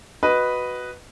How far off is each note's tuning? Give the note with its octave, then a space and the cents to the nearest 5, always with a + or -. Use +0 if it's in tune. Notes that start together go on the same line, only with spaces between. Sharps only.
F#4 +0 B4 +0 D#5 +0